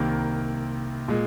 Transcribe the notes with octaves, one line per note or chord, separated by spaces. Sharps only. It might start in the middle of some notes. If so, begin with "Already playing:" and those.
Already playing: C2 C3 D#3 A#3
A#2 G#3